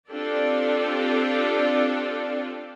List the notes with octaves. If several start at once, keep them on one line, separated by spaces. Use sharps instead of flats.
C4 D4 F4 G4 A4 D5